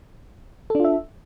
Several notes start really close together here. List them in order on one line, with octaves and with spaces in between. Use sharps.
A4 D4 F4 E5